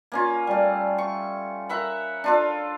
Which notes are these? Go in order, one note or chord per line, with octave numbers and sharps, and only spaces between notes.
A#3 C#4 F4
G3 A3
C#6
A#4 E5 F#5 B5
D4 F4 A4